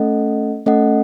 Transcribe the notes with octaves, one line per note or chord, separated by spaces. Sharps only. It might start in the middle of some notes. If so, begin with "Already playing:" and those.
Already playing: A3 C#4 A4 D#5 F#5
A3 C#4 A4 D#5 F#5